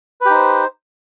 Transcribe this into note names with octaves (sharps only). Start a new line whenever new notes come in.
D#4 G4 B4 C5